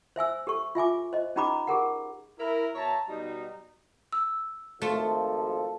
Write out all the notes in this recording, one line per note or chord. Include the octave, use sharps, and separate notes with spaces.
C5 E5 G#5 E6
G4 A4 C#6
F4 E5 G#5 D6
C5 D#5
C#4 D#4 G4 A#5 B5 D6
G4 G#4 A#4 F#5
E4 A#4
B2 C#5 E5 A5 A#5
B2 F#3 G3 D#4
E6
G#1 F3 A3 F4 A4